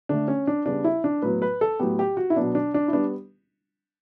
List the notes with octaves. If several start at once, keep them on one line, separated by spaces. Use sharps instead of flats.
D3 A3 D4
C#4
D4
C#3 G3 B3 D4
E4
D4
A2 F#3 B3 B4
B4
A4
A2 F#3 B3 G4
G4
F#4
E4
B2 F#3 B3 D4
D4
D4
E4
G3 B3 D4